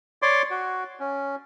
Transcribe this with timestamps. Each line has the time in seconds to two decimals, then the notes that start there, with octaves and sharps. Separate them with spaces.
0.22 C#5 D5 C6 D6
0.51 F#4
1.00 C#4